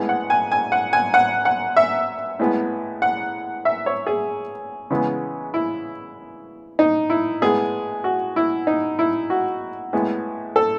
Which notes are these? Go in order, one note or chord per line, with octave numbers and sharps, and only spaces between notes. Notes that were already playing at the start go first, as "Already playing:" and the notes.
Already playing: A2 G#3 B3
F#5
G#5
G#5
F#5
G#5
F#5
F#5
E5
A2 G#3 B3
F#5
E5
C#5
G#4
C#3 E3 G#3 B3
E4
D#4
E4
A2 G#3 B3 G#4
F#4
E4
D#4
E4
F#4
A2 G#3 B3
A4